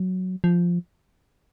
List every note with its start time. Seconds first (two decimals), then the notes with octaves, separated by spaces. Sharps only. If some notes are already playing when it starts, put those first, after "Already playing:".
Already playing: F#3
0.44 F3